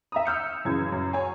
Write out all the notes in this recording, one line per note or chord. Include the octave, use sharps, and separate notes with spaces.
E5 A#5 D#6
E6 F6 G6 C#7
F#2 C#3 E3 B4 G#6
F#2
C#5 F#5 G#5